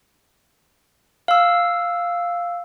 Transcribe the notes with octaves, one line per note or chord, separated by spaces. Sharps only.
F5 E6